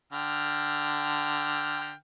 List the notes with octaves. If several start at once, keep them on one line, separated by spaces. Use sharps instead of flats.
D3 G5 F6